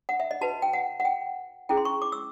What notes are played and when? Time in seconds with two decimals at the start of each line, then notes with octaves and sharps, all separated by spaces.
0.09 F#5
0.20 E5
0.31 D#5
0.41 F#4 B4 A5
0.62 G5
0.73 F#5
1.00 F#5
1.05 G5
1.69 C#4 E4 G#4 G5
1.77 C6
1.85 C#6
2.02 D6
2.12 E6